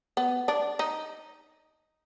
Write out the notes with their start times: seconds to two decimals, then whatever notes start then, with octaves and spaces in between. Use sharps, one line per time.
0.17 B3
0.48 D4
0.79 D#4